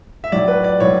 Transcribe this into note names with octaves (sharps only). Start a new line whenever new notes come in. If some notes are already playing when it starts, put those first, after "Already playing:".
E5
A2 F#3 D5
B4
D5
A2 F#3 C#5